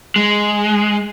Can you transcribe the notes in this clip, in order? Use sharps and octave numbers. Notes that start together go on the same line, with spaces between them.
G#3